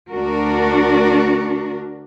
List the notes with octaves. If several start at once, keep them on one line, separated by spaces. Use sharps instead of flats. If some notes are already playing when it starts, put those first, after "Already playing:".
D2 D4 F#4 A#4